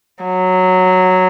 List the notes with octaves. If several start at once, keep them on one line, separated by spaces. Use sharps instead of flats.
F#3